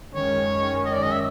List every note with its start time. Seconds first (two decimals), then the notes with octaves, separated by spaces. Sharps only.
0.14 F#2 D#3 G#3 C#4 C#5
0.85 D#5
0.95 D5
1.03 D#5
1.12 E5